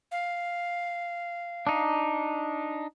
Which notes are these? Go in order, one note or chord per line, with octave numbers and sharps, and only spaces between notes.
F5
D4 D#4